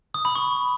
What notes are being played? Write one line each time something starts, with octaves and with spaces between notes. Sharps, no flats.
D#6
B5
C#6